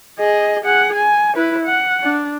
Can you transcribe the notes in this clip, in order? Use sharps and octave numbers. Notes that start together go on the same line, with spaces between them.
G#4 D#5
G#4 F#5
G#5
E4 B4
F#5
D4